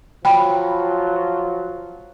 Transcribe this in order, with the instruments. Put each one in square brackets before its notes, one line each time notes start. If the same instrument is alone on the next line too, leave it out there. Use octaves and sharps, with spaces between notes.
[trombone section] F3 F#3 F4 [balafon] G5 B5